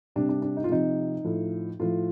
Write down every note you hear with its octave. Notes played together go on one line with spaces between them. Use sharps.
C3 G3 D4
D4
D4
D#4
F4
C3 F3 D#4
A2 F3
A2 F3 F4